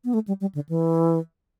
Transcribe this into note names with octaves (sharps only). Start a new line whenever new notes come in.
B3
A3
G3
G3
D3
E3